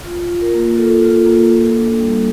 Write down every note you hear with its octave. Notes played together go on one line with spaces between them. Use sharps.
F4
F4
A#4
A#3
F4 A4
F4
A#3
A#3
D4
G3